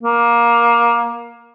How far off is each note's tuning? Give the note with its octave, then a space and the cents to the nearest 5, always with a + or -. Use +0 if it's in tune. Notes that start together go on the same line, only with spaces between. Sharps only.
A#3 +15